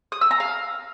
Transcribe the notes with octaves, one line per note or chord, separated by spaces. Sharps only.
D#6
E6
A#5
F5